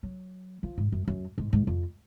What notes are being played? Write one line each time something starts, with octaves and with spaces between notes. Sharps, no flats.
F#3
F3
G#2
F#2
F#2
G#2
G#2
F2